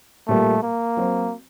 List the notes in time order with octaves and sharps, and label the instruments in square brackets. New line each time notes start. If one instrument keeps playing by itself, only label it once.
[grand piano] A#2 G3 A#3 [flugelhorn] A3
[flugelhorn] A#3
[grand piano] F#3 C4 F#4 C5